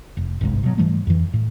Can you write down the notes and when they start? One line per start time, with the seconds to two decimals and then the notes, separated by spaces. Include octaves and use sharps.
0.17 F1
0.41 G1 C2 G#2
0.63 B2 F#3
0.78 G#2 E3 G3 A3
1.07 F2 E3
1.33 A2